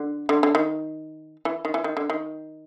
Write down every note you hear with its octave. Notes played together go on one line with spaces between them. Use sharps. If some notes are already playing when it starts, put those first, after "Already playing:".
Already playing: D3
D3
D3
D#3
E3
D#3
E3
D#3
D3
D#3